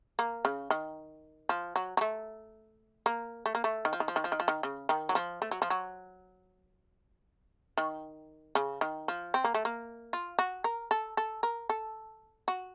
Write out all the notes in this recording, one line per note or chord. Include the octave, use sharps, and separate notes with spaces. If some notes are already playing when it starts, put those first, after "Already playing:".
A#3
C#3
D#3
F3
F#3
F#3
A3
A#3
A3
A#3
A3
D#3
F3
D#3
F3
D#3
F3
D#3
F3
D#3
C#3
D#3
F#3
F3
A3
F#3
F3
F#3
D#3
C#3
D#3
F3
C4
A#3
A3
A#3
F4
F#4
A#4
A4
A4
A#4
A4
F#4